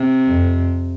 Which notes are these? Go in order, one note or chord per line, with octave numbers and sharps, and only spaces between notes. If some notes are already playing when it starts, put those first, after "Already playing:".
Already playing: C3
F2